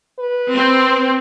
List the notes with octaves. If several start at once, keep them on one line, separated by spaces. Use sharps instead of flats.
B4
C4